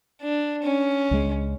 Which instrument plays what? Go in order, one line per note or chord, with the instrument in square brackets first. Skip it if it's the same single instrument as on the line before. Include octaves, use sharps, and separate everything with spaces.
[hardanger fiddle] D4
C#4
[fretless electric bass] C#2 G#3